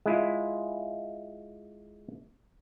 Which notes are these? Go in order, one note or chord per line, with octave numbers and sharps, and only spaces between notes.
G#3 E4 F4